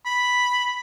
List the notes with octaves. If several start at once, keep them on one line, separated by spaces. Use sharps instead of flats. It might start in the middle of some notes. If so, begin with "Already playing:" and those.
B5